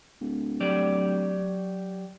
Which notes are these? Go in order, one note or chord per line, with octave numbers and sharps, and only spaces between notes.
D1
F#3 G4 D5